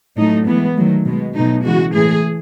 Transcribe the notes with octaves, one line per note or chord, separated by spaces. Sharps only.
A2 F#3 A3 D#4
A2 E3 G#3 B3
D#3 F#3 A3
B2 G#3
B2 F#3 A3 D#4
C#3 E3 G#3 F#4
A2 E3 A3 G#4